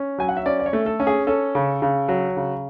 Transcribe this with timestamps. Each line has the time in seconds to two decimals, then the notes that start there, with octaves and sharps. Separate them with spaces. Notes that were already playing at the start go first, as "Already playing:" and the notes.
Already playing: C#4
0.18 F#3 G#5
0.29 F#5
0.37 E5
0.46 C#4 D5
0.59 D5
0.66 C#5
0.73 A3
0.86 A4
1.00 C#4
1.07 G#4
1.27 C#4 A4
1.55 C#3
1.82 C#3
2.09 F#3
2.37 C#3